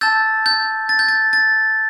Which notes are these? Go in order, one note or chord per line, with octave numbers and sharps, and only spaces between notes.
A5 E6 G6 A6
G6
A6
G6
A6
A6